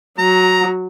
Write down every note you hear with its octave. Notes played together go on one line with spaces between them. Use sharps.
F#3 A#5